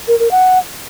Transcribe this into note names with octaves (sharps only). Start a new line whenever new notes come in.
A#4
A#4
F#5